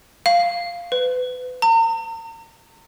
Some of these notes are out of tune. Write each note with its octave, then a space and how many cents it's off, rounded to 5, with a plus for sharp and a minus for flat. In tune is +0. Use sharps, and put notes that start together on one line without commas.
F5 -5
B4 +30
A#5 -40